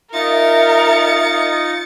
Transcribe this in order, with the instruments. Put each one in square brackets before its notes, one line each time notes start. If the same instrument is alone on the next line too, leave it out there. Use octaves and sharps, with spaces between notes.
[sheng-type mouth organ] D#4 F4 D#5 [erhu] A#4 [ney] E5 [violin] A6 C#7